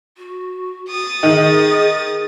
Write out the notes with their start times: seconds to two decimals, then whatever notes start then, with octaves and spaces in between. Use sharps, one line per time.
0.18 F#4
0.89 D#6 A6
1.23 D#3 G#4